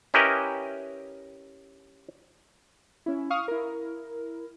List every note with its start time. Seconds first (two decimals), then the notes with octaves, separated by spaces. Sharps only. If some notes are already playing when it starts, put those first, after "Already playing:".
0.14 C#4 E4 G4 A#4 B4 D#5
3.06 C#4 E4
3.30 F5 C#6 D#6 F6
3.48 E4 A#4